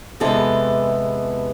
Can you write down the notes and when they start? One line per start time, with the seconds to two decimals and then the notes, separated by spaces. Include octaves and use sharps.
0.20 E2 C3 E3 G#3 B3 A4